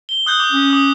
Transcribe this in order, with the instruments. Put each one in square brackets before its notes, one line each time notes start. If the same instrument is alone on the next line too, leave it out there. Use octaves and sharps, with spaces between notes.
[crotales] G7
D#6 F#6 G6
D6
[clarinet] C#4
[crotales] D6 D#6